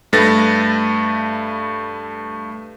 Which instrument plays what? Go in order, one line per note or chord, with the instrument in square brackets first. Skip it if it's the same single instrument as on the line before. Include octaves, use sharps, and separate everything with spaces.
[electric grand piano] G2 A3 B4 A6 A#6